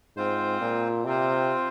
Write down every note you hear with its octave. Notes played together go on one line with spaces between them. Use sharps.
G#2 C4 F4 C5
A#2
C3 C4 F4 C5